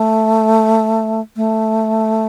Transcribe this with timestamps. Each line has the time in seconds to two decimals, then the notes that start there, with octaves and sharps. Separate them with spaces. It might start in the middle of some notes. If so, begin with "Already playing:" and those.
Already playing: A3
1.36 A3